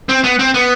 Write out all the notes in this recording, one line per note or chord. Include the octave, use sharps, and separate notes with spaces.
C4
B3
C4
B3